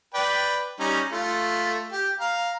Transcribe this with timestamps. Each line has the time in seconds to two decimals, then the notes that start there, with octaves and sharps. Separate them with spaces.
0.14 B4 D5 G5
0.80 G3 C#4 D#4
1.12 A3 F4
1.92 G4
2.20 F5 A#5